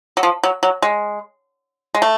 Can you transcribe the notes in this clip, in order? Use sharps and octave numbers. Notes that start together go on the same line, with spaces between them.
F#3
F3
F#3
F#3
G#3
G#3
A3